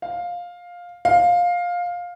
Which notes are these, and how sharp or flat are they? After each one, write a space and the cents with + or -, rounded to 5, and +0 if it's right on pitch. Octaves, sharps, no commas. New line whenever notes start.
F5 +10
F5 +15